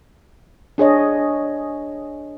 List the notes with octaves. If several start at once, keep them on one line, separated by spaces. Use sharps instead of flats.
D4 G#4 C#5 D#5